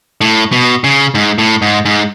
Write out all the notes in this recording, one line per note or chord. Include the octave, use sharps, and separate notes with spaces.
A2
B2
C#3
G#2
A2
G#2
G#2